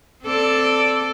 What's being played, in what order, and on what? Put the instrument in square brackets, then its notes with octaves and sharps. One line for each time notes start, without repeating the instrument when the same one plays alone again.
[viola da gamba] C4 A4 D5